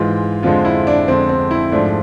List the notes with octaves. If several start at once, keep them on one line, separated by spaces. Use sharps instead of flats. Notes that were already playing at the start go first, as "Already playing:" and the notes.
Already playing: G#2 E3 G#3 F4
F2 D3 F3 G#3 F4
E4
D4
F2 D3 G#3 C4
C4
E4
G#2 F3 A3 D4